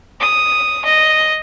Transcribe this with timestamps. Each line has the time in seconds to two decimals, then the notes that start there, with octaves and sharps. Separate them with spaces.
0.20 D#6
0.85 D#5